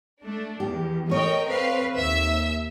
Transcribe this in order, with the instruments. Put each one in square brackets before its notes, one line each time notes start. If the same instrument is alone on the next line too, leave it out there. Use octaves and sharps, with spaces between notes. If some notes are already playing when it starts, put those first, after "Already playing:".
[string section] A3 D4
[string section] E2 [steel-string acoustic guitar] G4
[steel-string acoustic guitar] A3 C#5 [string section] A#4 D#5 G5
[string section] C4 B4 F5
D#2 E5 E6